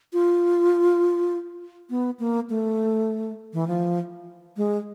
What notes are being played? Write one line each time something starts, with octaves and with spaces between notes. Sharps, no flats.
F4
B3
A#3
A3
E3
F3
G#3